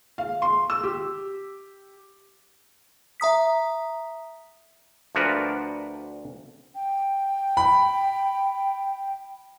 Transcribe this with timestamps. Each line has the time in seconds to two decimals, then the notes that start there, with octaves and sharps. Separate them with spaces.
0.18 F5
0.42 C6
0.70 E6
0.83 G4
3.20 E5 A#5 D#6 B6
5.15 D2 F3 D4 F#4 A#4 B4
6.75 G5
7.57 B5